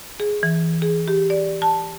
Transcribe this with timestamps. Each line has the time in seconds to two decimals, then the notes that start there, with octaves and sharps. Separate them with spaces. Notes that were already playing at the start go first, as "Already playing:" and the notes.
0.20 G#4
0.43 E3
0.82 G#4
1.08 G4
1.30 D5
1.62 A5